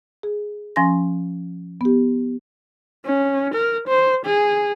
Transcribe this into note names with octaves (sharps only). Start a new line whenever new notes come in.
G#4
F3 C#4 G#5 C6 A#6
B3 G4
C#4
A#4
C5
G#4